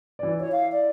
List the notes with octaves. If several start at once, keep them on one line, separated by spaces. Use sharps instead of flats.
E3 D5
E4 C#5
F5
D5